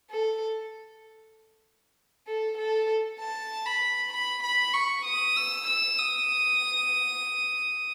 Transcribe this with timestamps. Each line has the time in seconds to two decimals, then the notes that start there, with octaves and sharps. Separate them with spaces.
0.11 A4
2.28 A4
2.58 A4
3.20 A5
3.66 B5
4.13 B5
4.43 B5
4.74 C#6
5.06 D#6
5.37 E6
5.67 E6
5.98 D#6